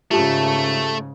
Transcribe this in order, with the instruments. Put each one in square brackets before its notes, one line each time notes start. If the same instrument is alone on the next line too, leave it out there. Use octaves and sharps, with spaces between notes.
[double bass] G#2 C#3 [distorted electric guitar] A3 [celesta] F4 G4 A5